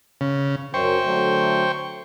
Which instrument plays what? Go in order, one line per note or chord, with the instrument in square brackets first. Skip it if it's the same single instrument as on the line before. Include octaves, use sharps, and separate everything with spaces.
[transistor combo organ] C#3
[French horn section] F#2 [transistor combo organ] C5 G5 C#6
[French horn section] D3 F#3 A3